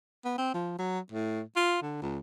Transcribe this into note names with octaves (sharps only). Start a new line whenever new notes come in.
B3
C4
F3
F#3
A2
F4
D3
C#2